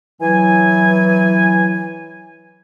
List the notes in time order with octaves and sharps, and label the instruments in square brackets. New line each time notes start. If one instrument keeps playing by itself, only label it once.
[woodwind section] E3 F#3 G#5